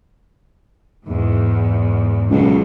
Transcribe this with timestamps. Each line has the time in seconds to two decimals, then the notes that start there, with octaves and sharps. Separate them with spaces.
1.06 E2 G#2
2.31 C#2 B2 D3 F#3